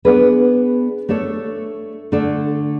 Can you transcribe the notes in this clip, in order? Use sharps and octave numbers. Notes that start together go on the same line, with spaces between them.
B3 D4 G#4 B4
A3 D4 A4 C#5
D3 A3 D4 A4